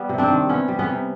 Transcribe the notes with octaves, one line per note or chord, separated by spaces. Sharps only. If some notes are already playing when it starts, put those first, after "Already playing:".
Already playing: G3 B3
C3
C4 D4
D#3
C3 B3 C#4
G3
B3 C#4
C3